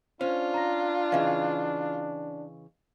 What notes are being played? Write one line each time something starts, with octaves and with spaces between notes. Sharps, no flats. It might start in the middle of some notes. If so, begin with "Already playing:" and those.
C#4 D4 F4 C5
A#5 A#6
C#3 E3 D#5 F5